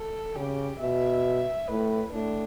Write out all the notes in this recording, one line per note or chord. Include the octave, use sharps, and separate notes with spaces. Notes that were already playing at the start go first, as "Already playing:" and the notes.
Already playing: A4
C#3 G4
B2 E5
A2 B4
A2 D4